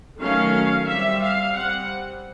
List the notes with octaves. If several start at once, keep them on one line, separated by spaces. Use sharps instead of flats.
D#3 F#3 A3 C#4 F5
G3 C4 E5
F5
G3 C4 F#5